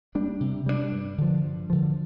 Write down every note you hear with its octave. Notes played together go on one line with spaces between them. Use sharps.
G3 A#3 D4
C3
G3 A#3 D4
G2
D3 F3
G2
D3 F3